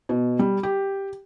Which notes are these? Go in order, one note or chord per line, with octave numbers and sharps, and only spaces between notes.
B2
G3
G4